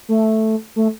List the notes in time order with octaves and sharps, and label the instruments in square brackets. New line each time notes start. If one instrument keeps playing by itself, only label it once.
[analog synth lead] A3
A3